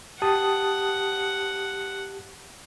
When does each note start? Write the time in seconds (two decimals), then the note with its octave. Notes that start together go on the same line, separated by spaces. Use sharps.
0.22 G4 F#5 A5 D#6